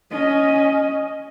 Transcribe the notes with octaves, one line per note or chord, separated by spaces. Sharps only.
C#4 D#5